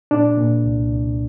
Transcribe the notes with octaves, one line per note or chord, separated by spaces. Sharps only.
A#2 D4
A#2
C2
C2